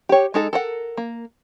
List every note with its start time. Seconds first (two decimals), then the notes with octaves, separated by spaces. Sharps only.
0.09 G4 C#5
0.34 G#3 D#4 A4
0.53 A4 A#4 F#5
0.97 A#3